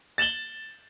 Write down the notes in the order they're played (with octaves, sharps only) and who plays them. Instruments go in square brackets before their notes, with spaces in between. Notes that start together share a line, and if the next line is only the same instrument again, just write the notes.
[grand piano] A6 E7 F#7 G7